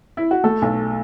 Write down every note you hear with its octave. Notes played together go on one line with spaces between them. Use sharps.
E4
F#4
A3 A4
B1